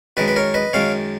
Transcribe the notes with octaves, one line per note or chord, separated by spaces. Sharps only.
F#2 D#3 G#3 B4 D#5
B4
A#4 C#5
B4 D#5
F#2 D#3 G#3 C#5 F5